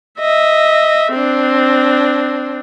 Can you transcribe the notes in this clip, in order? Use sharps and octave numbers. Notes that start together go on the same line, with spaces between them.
D#5 E5
C4 D4